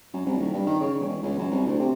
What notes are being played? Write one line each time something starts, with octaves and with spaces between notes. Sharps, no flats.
F#2
C2
D#1
G2
D#3
C#3
E1
C#2
F#2
C2
D2
C3